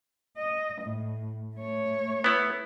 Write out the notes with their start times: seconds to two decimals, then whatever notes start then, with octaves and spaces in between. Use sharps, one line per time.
0.37 D#5
0.82 A2
1.56 A3 C#5
2.24 B3 E4